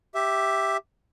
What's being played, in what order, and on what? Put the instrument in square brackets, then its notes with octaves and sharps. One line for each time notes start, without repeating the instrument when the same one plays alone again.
[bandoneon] G4 E5